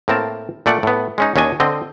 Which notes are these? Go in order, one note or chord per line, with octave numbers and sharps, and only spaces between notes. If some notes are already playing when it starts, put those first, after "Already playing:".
A2 A#3 C4 A#4 A5
A#2 A3 D5 F#5
A2 B3
G#3 C#4 D#4
D#2 C#4 D4 D#5 G#5
D3 C4 D#5